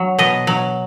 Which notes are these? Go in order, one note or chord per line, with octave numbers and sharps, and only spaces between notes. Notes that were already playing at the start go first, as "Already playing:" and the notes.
Already playing: F#3
B2 D#5
F#3